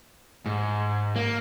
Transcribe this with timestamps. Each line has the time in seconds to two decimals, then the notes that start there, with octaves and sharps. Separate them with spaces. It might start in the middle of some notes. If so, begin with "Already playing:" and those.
0.46 G#2
1.16 A#3